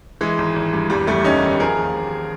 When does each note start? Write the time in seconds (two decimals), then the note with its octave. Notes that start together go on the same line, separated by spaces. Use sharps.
0.21 E3 G#3
0.38 G#1
0.56 G#1
0.73 G2
0.90 E2 G3
1.07 F#1 G3 A3
1.24 D#3 C#4 D#4
1.42 D#3
1.60 F3 G#4 A#4
1.77 D#2
1.95 D#2